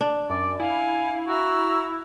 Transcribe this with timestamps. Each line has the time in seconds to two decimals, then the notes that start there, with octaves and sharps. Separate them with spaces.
0.01 D4
0.30 F#2 D5
0.60 E4 F5 G#5
1.28 F#4 E5 A#5 E6